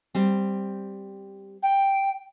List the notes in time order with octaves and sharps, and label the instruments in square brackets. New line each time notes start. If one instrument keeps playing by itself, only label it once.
[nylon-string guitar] G3 C4
[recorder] G5